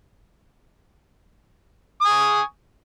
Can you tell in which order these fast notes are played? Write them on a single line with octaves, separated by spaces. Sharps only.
D#6 G#5 C#6